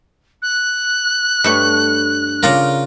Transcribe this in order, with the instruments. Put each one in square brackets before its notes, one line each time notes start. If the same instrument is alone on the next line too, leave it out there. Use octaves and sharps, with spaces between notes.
[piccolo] F#6
[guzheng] G2 A3 C#5
[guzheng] C#3 D5 A#5 [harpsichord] F4 A#4